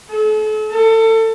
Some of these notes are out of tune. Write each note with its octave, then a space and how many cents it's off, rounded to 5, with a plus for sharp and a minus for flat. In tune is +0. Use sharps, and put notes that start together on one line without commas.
A4 -40
A4 +30